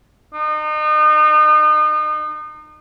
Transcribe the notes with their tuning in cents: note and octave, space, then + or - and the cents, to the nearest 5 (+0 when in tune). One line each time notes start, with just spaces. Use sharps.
D#4 -35